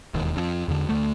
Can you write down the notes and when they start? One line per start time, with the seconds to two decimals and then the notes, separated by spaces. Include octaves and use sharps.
0.14 E1 D#2
0.37 F2
0.68 E2 D3
0.89 D2 A3